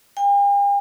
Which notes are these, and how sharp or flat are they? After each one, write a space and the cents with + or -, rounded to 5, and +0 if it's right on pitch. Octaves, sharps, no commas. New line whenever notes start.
G5 +45